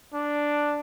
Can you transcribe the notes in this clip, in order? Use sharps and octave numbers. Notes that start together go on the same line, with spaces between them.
D4